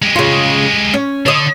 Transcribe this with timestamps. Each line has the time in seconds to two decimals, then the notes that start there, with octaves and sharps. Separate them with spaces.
0.02 G#3 G4
0.16 C#3 F4
0.94 C#4
1.26 D3 C#5 D#5